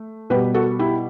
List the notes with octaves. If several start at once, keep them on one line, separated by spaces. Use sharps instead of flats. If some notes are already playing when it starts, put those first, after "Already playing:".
Already playing: A3
B2 G3 G4 B4
F#4 A4
E4 G4